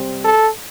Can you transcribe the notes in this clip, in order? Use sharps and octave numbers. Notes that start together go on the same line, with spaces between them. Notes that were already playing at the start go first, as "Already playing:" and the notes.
Already playing: C3 G3 C4
A4